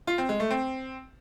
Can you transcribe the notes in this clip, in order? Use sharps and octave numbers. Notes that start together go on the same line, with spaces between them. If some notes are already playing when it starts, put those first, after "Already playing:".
F4
C4
G#3
A3
C4